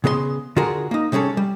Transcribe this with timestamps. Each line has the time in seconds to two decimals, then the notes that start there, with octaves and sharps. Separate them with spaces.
0.04 C#3 B3 G#4 D5 C6
0.56 D3 F4 F#4 G#4 A#4
0.91 A#3 D#4
1.12 C3 G3 C#4 G#4 A4
1.37 G3